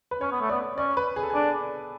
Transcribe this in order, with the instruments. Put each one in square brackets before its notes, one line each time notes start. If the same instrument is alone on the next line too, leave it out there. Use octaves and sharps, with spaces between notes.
[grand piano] B4
[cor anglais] C#4 [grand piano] C#5
[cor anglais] B3
A3
[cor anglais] B3 [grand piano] D5
[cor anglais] C#4 [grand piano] D5
[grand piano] B4
G#4
A4
[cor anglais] D4 [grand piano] G#4